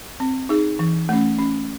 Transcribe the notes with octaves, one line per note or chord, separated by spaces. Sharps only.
C4
D#4 G#4
E3
A3 C#4
C#4